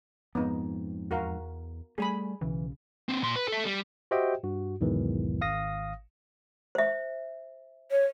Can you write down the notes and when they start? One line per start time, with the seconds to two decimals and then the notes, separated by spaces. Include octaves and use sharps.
0.35 F2 G#2 B3 D#4
1.11 E2 F#4 A#4 F5
1.98 G3 A3 G#4 G#5 B5
2.41 B1 C#3 E3
3.09 A#3 C4
3.22 A#2 C6
3.36 B4
3.48 A4 E5
3.65 G3
4.11 F#4 G4 C5 D#5 E5 G5
4.44 G2 F#4
4.81 B1 E2 G#2 D#3 E3
5.41 G#1 F5 D#6 A#6
6.75 C5 E5
7.91 C#5